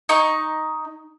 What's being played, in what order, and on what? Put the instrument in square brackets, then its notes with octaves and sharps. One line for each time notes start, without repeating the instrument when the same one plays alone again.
[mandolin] D#4 C#6